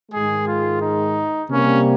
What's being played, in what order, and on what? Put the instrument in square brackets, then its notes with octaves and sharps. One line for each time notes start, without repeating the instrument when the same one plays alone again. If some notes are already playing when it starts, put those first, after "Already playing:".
[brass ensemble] G#2 D#3 G#3 G#4
F4
D#4
C3 G3 A#3 C#4